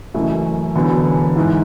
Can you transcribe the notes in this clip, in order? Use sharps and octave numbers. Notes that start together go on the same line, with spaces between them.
F#1 F#2 E3 A3
E1 E2 D3 F#3 B3
G#2 E3